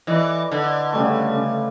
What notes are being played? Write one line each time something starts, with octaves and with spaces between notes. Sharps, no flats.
E3 B4 D5 D#5
D3
C#3 G3 A3
C#3